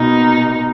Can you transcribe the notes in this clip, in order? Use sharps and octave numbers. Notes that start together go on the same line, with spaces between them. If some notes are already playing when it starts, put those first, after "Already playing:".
Already playing: B2 A#3 D#4